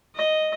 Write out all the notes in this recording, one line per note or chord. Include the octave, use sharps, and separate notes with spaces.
D#5